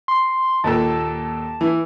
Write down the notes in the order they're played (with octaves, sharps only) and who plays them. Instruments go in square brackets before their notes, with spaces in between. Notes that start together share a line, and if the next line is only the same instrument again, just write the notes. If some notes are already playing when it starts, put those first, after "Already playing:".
[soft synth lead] C6
[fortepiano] D#2 A#2 A4 [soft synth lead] A5
[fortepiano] E3